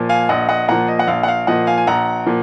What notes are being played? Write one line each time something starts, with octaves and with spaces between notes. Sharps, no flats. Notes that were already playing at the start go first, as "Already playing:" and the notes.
Already playing: A#2 F3
F5 G#5
A#1 D#5 F#5
D#5 F#5
A#2 F3 F#5 A#5
D#5
F#5
A#1 F5
F#5
F5
A#2 F3 D#5 F#5
F5 G#5
G#5
A#1 F#5 A#5
A#2 F3